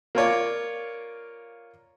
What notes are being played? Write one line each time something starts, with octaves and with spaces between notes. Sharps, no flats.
A#3 F4 C#5 D5